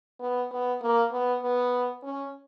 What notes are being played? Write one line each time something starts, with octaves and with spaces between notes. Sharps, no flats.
B3
B3
A#3
B3
B3
C#4